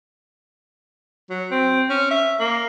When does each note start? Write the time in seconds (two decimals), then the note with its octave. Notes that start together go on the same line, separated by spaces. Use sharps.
1.30 F#3
1.51 C4
1.89 C#4
2.11 E5
2.40 A#3